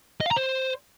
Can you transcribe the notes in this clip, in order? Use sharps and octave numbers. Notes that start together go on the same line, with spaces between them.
D#5
F5
A#5
C5